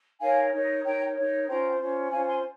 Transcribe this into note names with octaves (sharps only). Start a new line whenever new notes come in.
D#4 A#4 C#5 F5 G#5
D#4 A#4 C#5
D#4 A#4 C#5 G5 A#5
D#4 A#4 C#5
C#4 F4 C5 G5 A#5
C#4 F4 C5
C#4 F4 C5 F5 G#5
G#5 C6